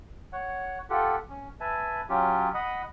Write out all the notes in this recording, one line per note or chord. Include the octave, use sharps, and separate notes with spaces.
C#5 F#5
F4 G4 A4 F#5
C#4
B4 E5 G#5 A5
F#3 C#4 F4 G4
D#5 F#5 B5 D#6